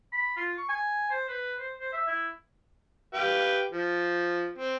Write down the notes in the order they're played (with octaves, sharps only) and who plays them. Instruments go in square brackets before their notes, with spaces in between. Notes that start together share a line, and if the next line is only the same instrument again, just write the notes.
[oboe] B5
F4
C#6
G#5
C5
B4
C5
C5
E5
E4
[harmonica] G4 B4 F5
F3
C4